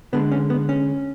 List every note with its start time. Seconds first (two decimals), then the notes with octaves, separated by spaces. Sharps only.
0.13 D3 G#3 B3
0.32 C#4
0.50 B3
0.69 C#4